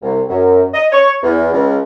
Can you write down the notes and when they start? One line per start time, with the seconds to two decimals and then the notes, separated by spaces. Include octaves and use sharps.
0.02 C2
0.29 F#2
0.74 D#5
0.91 C#5
1.23 E2
1.52 C#2